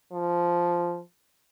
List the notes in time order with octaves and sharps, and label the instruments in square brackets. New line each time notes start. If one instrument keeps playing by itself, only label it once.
[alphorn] F3